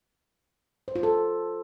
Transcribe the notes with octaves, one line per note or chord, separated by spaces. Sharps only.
C5
F4
A4